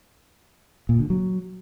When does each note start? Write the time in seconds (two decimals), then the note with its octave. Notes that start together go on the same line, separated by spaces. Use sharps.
0.89 A#2
0.99 D3
1.10 F#3